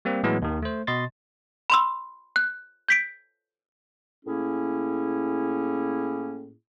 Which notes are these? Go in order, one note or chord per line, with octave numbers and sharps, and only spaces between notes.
G3 A#3 C4
A2 E3 F#3 G#3 B3
D#2 D#3
A3 C5
B2 D#5 C6 A6
B5 C6 E6
F#6
G6 B6 D7
A2 A#3 C#4 E4 G#4